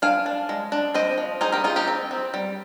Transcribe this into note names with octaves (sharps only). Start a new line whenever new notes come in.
D4 F5 G#5
D4
G#3
D4
C4 C5 D#5
F3
D#4 G#4 C5
G4 A#4
D#4 F4 G#4
D#4 G4
C4
C4
G3